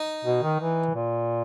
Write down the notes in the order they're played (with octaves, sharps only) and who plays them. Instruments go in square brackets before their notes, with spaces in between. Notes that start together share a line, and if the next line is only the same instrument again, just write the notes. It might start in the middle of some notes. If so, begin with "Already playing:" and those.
Already playing: [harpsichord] D#4
[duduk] B2
D#3
E3
A#2